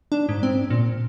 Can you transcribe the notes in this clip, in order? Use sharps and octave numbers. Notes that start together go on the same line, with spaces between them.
D4
G#2
C4
A#2